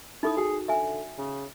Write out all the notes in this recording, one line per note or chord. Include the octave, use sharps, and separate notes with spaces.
D#4 E4 A4 D#6
F#4 G#4 G5
D3 E5 G#5
C#3